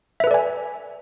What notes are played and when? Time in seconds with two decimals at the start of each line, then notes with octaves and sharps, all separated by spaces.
0.20 E5
0.24 B4
0.27 A4
0.31 D5
0.34 G#5